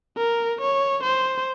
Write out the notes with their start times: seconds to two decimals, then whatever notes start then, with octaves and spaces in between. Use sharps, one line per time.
0.17 A#4
0.61 C#5
1.03 C5